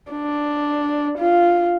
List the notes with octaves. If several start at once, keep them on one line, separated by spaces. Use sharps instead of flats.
D4
F4